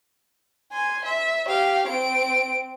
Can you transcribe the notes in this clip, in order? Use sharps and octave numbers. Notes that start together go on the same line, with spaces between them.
G#5 C6
E5
G4 F5
C4 D7